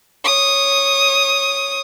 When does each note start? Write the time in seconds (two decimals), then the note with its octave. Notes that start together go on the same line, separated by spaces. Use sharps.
0.24 C#5 D#6